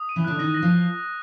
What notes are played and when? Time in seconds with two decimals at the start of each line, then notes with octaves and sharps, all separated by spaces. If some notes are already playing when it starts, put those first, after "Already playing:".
Already playing: D#6
0.09 D#7
0.16 E3 E4
0.24 D3 D4 F#6
0.39 D#3 D#4 A#6
0.54 A#6
0.62 F3 F4